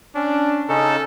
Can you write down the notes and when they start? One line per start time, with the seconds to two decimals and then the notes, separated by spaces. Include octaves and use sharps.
0.15 C#4 D4
0.69 C#3 C#4 D#4 A4